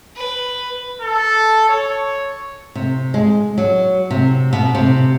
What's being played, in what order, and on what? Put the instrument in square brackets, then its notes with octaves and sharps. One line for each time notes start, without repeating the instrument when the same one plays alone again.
[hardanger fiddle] B4
[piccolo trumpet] A4
C#5
[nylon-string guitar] C3
G#3
F#3
C3
B2
C3